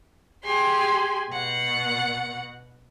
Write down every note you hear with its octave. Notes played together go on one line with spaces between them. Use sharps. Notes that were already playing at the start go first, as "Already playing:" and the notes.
G4 G#4 G#5 C6
B2 F#5